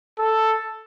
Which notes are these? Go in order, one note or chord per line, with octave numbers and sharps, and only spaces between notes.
A4